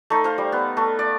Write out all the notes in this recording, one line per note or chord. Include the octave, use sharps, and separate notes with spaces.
A3 D#4
C5 F5
G3
B3
A3
D5